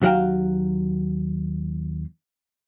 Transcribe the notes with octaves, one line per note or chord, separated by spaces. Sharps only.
D#2 F#3 F#4 F5 G5